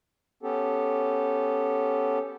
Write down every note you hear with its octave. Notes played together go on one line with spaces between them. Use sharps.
B3 C#4 G4 A4